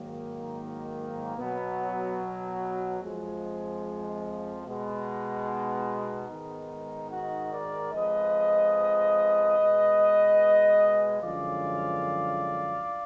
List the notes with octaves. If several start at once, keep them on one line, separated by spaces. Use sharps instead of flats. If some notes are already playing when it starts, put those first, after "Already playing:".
Already playing: G#2 D#3 F#3 A#3
B2 F#3 B3
F2 F3 G#3
B2 G#3
B3 D#4
G#2 D#3 G#3
D#4 F#4
A#4 D5
F2 F3 G#3 B4 D#5
B2 G#3
F#2 D3 F3 G#3 D5 F5